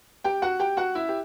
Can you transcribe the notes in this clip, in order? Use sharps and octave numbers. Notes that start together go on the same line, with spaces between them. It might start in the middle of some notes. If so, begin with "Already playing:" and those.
G4 G5
F#4 F#5
G4 G5
F#4 F#5
E4 E5
G4